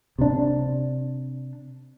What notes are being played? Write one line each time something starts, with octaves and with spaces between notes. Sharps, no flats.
C3 D4